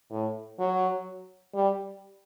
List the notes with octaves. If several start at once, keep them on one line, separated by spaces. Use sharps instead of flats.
A2
F#3
G3